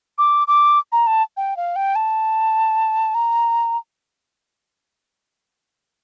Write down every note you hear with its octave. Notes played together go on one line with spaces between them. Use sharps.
D6
D6
A#5
A5
G5
F5
G5
A5
A#5